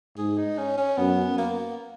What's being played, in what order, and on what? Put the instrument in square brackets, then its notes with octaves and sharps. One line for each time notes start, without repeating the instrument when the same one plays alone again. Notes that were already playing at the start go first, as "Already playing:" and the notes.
[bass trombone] G#2 [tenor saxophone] G#4
[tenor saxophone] D#4
C#4
C#4
[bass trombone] F#2 [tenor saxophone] B3
[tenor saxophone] A#3